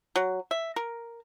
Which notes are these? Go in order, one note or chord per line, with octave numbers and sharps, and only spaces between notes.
F#3
E5
A#4